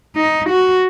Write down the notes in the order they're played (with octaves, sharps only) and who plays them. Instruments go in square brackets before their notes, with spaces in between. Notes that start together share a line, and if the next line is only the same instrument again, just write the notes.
[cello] D#4
F#4